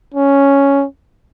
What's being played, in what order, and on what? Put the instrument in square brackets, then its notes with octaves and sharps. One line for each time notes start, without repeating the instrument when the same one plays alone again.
[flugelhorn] C#4